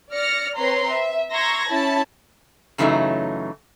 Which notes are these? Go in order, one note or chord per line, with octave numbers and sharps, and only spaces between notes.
D5 F6 A#6 C#7
C4 B4 C#5 A#5 C6
E5
A#5 C6 C#6 E6 G#6 A#6
C#4 E4 A5 B5
F#2 C#3 E3 F#3 A3 D#4